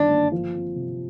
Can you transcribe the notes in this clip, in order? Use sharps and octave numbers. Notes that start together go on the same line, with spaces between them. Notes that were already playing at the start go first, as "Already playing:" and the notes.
Already playing: G1 G2 D#3 D4
A#3
F3
C4
C3